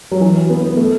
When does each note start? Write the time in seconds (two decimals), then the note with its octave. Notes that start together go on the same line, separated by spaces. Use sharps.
0.12 F#3
0.21 E3
0.50 B3
0.63 B3
0.77 A3